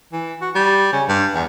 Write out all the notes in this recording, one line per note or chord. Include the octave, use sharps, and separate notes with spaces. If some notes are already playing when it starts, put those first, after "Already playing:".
E3
F#4
G3
C#3
G2
E2